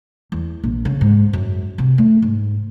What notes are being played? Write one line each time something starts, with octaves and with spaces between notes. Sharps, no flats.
E2
A#1
C#3
G#2
F#2
C3
A3
G#2